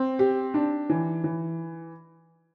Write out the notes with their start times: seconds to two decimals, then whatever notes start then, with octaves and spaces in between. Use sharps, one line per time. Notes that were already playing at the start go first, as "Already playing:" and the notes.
Already playing: C4
0.19 G4
0.54 D4
0.89 E3
1.24 E3